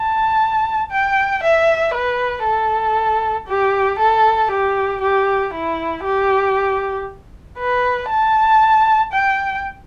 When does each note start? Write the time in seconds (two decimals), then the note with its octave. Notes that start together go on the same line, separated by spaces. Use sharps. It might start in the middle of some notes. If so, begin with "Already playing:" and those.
Already playing: A5
0.91 G5
1.43 E5
1.94 B4
2.45 A4
3.48 G4
3.99 A4
4.51 G4
5.02 G4
5.54 E4
6.04 G4
7.58 B4
8.09 A5
9.12 G5